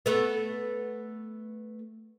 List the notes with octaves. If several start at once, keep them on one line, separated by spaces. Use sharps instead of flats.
A3 B3